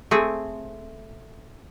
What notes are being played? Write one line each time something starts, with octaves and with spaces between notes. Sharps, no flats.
A3 C4 G#4